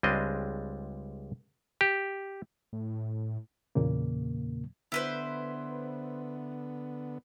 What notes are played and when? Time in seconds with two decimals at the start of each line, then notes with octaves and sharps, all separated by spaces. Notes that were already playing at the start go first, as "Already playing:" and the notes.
0.03 C#2 G3 G#3 C4 D4 D#5
1.81 G4
2.73 A2
3.75 E2 A#2 C#3 A#3
4.92 D3 B3 E4 B4 C5